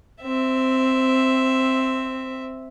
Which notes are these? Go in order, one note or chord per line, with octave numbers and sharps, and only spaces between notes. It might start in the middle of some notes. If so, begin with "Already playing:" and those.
C4 E5